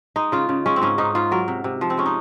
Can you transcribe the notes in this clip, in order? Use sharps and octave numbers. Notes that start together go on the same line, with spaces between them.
G#3 D#4
C#3 F4
C#3
G#3 C#4
C4
G#2 C#4
G#2 D#4
G#2 F4
F#3 A#4
C3
C3
F3
C4
G#3 C#4
D#4